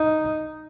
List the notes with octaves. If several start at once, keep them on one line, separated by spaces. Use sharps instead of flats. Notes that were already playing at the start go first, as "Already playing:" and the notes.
Already playing: D#4